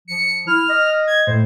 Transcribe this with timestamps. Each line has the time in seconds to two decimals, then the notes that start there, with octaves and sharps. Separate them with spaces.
0.08 F3 C#7
0.47 E4 F6
0.70 D#5
1.07 G#6
1.27 A2 C5